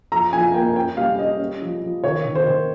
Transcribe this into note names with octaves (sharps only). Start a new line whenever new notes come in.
F3 A#5
F3 G#5
A#3 G5
C#4 G5
G3 F5
C#4 D#5
C#4
F3
F3
D#3 C#5
D#3
C5
D#3